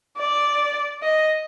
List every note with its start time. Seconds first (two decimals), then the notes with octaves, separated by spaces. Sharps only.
0.18 D5
1.03 D#5